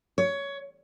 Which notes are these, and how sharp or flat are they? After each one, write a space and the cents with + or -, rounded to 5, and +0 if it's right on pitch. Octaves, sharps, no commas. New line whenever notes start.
C#5 +15